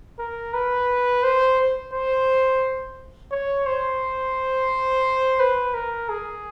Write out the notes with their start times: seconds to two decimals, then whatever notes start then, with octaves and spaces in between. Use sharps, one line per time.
0.19 A#4
0.54 B4
1.24 C5
1.93 C5
3.32 C#5
3.66 C5
5.40 B4
5.74 A#4
6.09 G#4